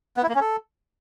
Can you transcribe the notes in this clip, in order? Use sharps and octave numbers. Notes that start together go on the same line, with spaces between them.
B3
E4
A#3
C#4
A4